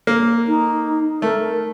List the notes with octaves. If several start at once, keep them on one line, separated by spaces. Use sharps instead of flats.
A#3
D#4
A3 A#4